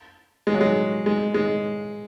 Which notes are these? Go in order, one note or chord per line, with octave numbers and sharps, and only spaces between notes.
G#3
F#3
G#3
G#3
G#3